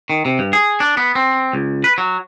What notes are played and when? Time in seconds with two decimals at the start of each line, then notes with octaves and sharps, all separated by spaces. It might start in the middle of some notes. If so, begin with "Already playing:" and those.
0.10 D#3
0.25 C3
0.39 G2
0.53 G#4
0.80 D4
0.97 B3
1.15 C4
1.53 C#2
1.84 B4
1.98 F#3